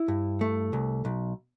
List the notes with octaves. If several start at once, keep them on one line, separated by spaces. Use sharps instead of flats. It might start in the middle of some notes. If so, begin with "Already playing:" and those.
Already playing: E4
G2
A3
C2
B1